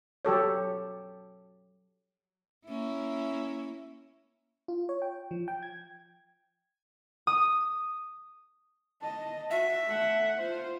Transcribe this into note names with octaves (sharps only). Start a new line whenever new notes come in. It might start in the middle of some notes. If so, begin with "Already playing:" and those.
F#3 G4 A4 C#5
A#3 C#4 E4
F4
C#5
G5
F3
G5
G#6
D#6
D#5 A5
F#4 E5
A3 F#5
F4 C5